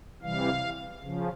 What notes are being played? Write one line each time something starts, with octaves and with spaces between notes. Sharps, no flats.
C3 E3 G3 F5
C#3 F3